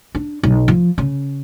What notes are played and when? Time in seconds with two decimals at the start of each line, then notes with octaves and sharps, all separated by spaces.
0.15 D4
0.43 B1
0.68 F3
0.98 C#3